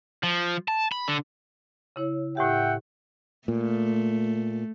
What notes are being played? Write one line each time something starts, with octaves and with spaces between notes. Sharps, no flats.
F3
A5
B5
D3
C#3 E4 C#5
A2 E4 G4 E5 F#5 G5
A#2 A3